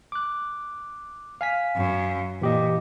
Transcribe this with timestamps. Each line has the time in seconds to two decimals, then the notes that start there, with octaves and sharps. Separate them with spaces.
0.12 D6 F#6
1.41 F5 G#5 B6
1.76 F#2
2.41 A#2 E3 G4 D#5